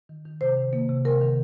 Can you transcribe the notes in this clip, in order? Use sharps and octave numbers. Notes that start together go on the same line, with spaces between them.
D#3
D#3
C3 C5
D#3
A#3
C3
C3 A#4
D#3